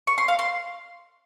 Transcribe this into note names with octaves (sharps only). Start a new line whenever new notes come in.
C#6
C6
F5
C6